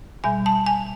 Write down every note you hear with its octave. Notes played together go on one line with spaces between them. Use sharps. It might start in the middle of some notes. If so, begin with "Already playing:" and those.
B2 G3 G#5
A5
G#5